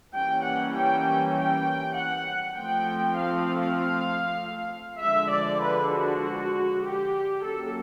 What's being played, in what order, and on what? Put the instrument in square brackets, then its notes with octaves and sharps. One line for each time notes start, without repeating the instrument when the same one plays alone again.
[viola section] E3 G3 A#3 C#4 G5
F#5
G5
G5
F#5
F3 A3 C4 G5
F5
D3 F3 G#3 E5
D5
B4
F#4
G4
F#3 A#3 C#4 A4